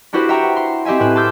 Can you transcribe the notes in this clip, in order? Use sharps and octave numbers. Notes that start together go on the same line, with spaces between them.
D4 E4 F#4 G4 B4 C5
E5 F#5 G5 A#5 C#6
C6
C4 G4 D#5 E5 G#5
A2 C4 G#4 B4 E7
A5 C6 D6 E6 F6 G6